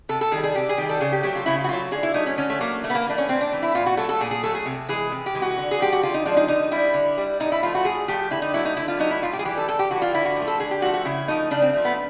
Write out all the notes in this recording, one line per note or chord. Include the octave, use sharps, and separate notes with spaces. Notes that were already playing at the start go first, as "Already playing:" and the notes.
C3 A4
A4
D#3 G3 G#4
G#4
C3 G4
G#4
D#3 G3 G4
A4
C#3 G#4
G4
F#3 A3 G4
F4
C#3 E4
F4
F#4
F#3 A3 F4
D3 G#4
E4
F#3 A3 D#4
C#4
D3 C#4
A3
F#3 A3 A#3
A2 A3
B3
A#3
E3 A3 D4
C#4
A2 C4
D4
E3 A3
E4
A#2 F4
F#4
F#3 A3 A4
A4
A#2 G#4
G#4
F#3 A3 A4
G#4
C3
E3 G#3 G#4
C3
G4
E3 G#3
F#4
D3
G#4
F3 G#3 G4
F#4
D3 F4
D#4
F3 G#3 D4
D#4
D3 D#4
G3 E4
D3
G3
A2 D#4
E4
F3 A3 F4
F#4
A2 G#4
F3 A3 G4
D3 E4
D#4
F#3 A3 E4
D#4
D3 E4
F4
F#3 A3 D#4
E4
A2 F4
G4
G#4
E3 G3 G4
A4
A2 A4
G4
E3 G3 F#4
F4
D3 E4
F#4
F3 A3
A4
D3 G#4
G4
F3 A3 F#4
F#4
C#3 E4
F3 A3 D#4
C#3 D4
C4
F3 A3
B3